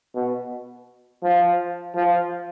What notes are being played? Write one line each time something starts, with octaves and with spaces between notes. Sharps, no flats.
B2
F3
F3